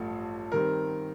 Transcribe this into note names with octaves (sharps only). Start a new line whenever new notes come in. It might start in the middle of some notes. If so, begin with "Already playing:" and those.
Already playing: A1 G2 F3 A3
D#3 G3 C4 A#4